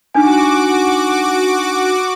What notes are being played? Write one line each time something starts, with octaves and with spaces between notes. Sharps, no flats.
D4 D#4 F#4 G#5 D6